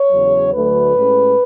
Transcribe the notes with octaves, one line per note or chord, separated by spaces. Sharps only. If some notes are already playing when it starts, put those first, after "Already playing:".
Already playing: C#5
E2 C#3 F#3
D2 D3 F#3 A3 B4
A2 G#3 C#4